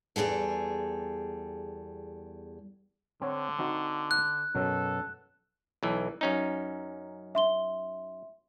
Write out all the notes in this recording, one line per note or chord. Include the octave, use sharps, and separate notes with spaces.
E2 C#3 G3 G#4 A4
D3 C4 C#5 F#5
C4 D#4 F#4
F#6
F#2 B2 F#3 A4
B1 E3
F#2 C#4 D#4
E5 C6 G7